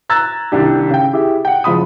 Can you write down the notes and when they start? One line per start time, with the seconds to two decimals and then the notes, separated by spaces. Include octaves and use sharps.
0.09 A#5 E6 F#6 G#6 A6
0.52 C2 D#3 D4 G4
0.90 C#3 G5
1.13 E4 G4 G#4
1.45 F#5 G5
1.64 F#1 F3 G#3 B5 D#6